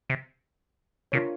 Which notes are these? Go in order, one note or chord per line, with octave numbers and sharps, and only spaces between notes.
C3
C3 D4 F4 A#4 C#5